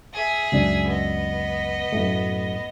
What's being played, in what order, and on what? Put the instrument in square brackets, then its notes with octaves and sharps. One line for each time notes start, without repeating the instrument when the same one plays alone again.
[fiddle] G#4 E5
[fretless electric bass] C#2 F#2 D4
[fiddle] B3 D#5
[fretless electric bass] F#2 A2 A3